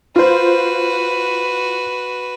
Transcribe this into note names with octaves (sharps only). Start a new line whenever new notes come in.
F4 F#4 B4 C5